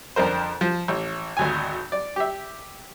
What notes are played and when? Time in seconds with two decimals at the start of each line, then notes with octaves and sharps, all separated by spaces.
0.16 F2 D3 A#4 C5
0.61 F3
0.88 A1
1.37 G#1 D2 G#5
1.92 D5
2.16 G4 E5